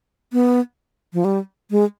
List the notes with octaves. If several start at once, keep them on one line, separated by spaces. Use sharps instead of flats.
B3
F3
G3
G#3